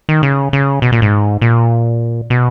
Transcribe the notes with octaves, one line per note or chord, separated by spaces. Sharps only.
D#3
C#3
C#3
B2
A#2
G#2
A#2
B2